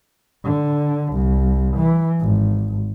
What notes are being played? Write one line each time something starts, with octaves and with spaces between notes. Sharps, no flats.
D3
C2
E3
G#1